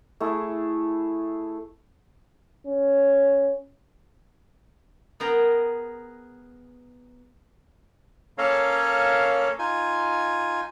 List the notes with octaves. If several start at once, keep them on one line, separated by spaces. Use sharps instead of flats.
A3 E4 G#4
C#4
B3 G#4 A#4 G5 A#5
A#3 C#4 A4 A#4 C#5 F5
D#4 F4 G#5